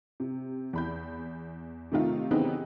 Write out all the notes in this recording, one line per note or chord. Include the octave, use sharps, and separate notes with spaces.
C3
E2 B5 G6
C3 D#3 A3 D#4 F4
C#3 E3 B3 C4 D#4 G4